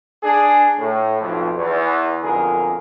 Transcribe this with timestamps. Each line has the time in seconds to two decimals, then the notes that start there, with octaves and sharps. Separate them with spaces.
0.22 D4 G#4
0.79 A2
1.21 B1 F2
1.58 E2
2.23 B1 F2 D3 G#4 A#4